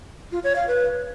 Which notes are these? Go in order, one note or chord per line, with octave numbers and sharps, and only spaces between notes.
F4
C#5
F5
B4